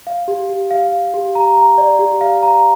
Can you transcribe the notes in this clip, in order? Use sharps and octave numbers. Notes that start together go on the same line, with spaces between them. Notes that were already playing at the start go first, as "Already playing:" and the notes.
F5
G4
G4
F5
F5
G4
A#5
A#5
D5
G4
F5
A#5